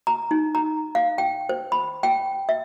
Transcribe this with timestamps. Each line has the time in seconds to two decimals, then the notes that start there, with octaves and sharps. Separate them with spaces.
0.07 A#5
0.31 D#4
0.55 A#5
0.95 F5
1.18 G5
1.49 C5
1.72 B5
2.03 G5
2.49 E5